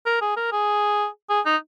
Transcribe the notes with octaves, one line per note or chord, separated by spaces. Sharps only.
A#4
G#4
A#4
G#4
G#4
D#4